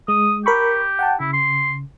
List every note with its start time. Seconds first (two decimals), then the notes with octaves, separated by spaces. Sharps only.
0.08 G#3 D#6
0.46 G4 A#4 B5 C#6
0.99 F#5 G5 A5
1.20 C#3 E4
1.33 C6